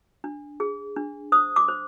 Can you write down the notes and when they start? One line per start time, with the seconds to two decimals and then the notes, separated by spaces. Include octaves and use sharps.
0.24 D4
0.60 G#4
0.96 D4
1.32 C5 D#6
1.56 D6
1.69 C5